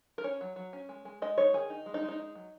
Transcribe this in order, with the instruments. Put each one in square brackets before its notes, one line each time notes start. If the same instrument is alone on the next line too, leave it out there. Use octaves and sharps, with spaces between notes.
[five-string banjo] A#4
C#4 C#5
F#3
F#3
C#4
G#3
G#3
G#3 D#5
D#4 C#5
D#3 G#4
D#4
G#3
D#4
G#3
D#4
D#4
F#3